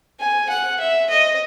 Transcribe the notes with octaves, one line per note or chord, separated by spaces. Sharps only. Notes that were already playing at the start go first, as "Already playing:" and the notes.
G#5
F#5
E5
D#5